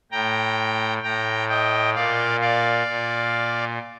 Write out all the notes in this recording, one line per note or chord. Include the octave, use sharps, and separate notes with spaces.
A2 G5 A#5
A2 G5 A#5
D#5 G5
A#2 D5 F5
D5 F5
A#2